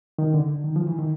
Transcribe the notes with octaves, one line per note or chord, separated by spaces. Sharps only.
D#3
D3
D#3
F3
E3
D#3